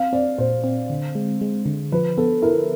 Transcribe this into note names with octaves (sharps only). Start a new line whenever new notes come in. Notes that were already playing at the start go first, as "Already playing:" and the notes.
Already playing: C4 F5
C4 D5
A#2 C5
C4
D3
G#3
G#3
D3
F3 B4
B3 A4
E4 A#4